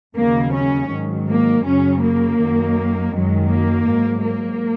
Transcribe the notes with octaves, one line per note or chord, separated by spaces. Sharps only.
D#2 C#3 F#3 A#3
C#4
G#2 D#3 F#3
A#3
F#2 C#3 F#3 C#4
A#3
F#2 D#3 F#3
F#2 D#3 F#3 G#3
A#3
G#2 F#3
A#3